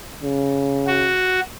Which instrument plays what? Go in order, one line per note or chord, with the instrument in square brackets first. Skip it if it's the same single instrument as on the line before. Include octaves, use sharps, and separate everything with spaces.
[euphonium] C#3
[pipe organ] F#4